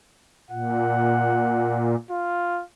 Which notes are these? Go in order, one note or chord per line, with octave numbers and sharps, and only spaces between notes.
A#2 F#5
F4